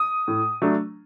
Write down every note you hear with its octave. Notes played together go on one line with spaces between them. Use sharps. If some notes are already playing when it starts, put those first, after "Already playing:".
Already playing: D#6
A2
F#3 A3 D4